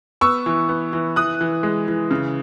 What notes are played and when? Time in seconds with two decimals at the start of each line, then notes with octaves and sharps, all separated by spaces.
0.21 B3 C#6 E6
0.46 E3
0.69 B3
0.93 E3
1.16 E3 D#6 F#6
1.41 E3
1.63 G#3
1.88 E3
2.11 C#3